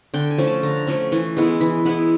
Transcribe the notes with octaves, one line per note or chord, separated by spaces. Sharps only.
D3 G5
G#5
F3 A3 C#4
A5
D3 A#5
F3 A3 C#4
E3
G#3 B3 E4
E3 B5
G#3 B3 E4 B5